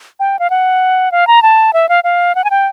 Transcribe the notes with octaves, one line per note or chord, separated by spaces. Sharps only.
G5
F5
F#5
F5
A#5
A5
E5
F5
F5
F#5
G#5
G5